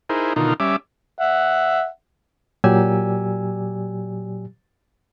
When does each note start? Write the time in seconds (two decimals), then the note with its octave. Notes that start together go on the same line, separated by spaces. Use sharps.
0.09 D#4 E4 G#4 A#4 C5
0.36 B2 D3 D#3 D#4 F4 A#4
0.60 G3 C#4 E5 D6
1.19 E5 F#5
2.64 A#2 F#3 G4 D5 G#5 E6